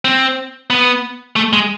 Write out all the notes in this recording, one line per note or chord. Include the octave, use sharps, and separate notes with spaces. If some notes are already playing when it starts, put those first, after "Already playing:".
C4
B3
A3
G#3